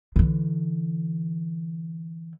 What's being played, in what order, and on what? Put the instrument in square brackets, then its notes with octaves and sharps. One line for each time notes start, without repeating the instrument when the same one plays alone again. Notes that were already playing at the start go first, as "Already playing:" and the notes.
[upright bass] D3 E3